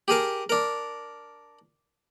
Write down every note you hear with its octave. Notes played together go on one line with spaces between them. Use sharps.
G4 G#4 A#4 A5
D4 A#4